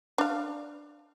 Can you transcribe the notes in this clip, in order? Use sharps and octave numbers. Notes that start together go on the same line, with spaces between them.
D4 F5